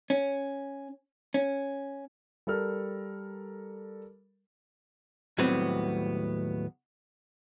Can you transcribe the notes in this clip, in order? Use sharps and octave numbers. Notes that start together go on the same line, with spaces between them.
C#4
C#4
G3 A4 A#4 F6
D#2 A2 F#3 G3 B3 C4